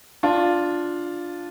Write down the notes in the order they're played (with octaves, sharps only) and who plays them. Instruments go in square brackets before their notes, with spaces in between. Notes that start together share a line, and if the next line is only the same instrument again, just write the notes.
[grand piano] D4 F4